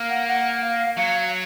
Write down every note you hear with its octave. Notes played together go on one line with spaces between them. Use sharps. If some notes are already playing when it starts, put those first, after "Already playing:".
Already playing: A#3
F#5
F#5
F5
F#3 F5